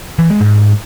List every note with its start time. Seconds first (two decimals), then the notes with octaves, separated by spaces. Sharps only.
0.19 E3
0.30 G#3
0.41 G#2